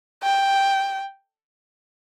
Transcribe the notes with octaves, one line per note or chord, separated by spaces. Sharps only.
G5